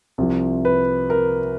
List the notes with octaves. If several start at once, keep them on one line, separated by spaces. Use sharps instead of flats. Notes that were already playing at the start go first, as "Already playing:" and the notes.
C2 C3 F3
B4
A#4